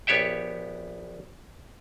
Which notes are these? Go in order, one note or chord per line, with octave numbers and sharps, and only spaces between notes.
A#1 B3 G4 C#5 E5 G5